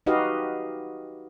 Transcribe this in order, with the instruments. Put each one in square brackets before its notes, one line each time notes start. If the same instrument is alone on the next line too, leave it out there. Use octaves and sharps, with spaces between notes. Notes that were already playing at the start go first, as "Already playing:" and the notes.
[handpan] D#4 F#4 G4 B4 D#5 F5